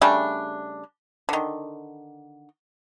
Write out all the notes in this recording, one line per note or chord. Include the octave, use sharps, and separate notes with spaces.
C#3 G3 A3 D4
D3 D#3